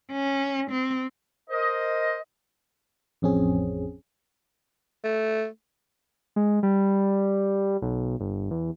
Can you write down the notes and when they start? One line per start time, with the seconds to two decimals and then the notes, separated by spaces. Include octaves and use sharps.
0.12 C#4
0.71 C4
1.50 A#4 C5 D#5
3.22 A1 F2 C4 C#4 G#4
5.04 A3
6.36 G#3
6.63 G3
7.82 B1
8.20 G1
8.51 E2